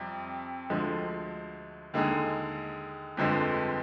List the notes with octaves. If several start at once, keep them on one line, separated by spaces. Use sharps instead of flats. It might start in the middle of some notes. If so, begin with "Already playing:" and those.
Already playing: F2 C3 G3 C4
D2 D3 F3 G#3
D#2 D3 G#3 D#4 G#4
G1 F2 D3 F3 G#3